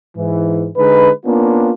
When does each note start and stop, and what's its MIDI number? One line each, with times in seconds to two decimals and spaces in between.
0.17 0.68 44
0.17 0.68 52
0.77 1.10 50
0.77 1.10 56
0.77 1.10 63
0.77 1.10 71
1.25 1.71 58
1.25 1.71 59
1.25 1.71 61
1.25 1.71 62
1.25 1.71 65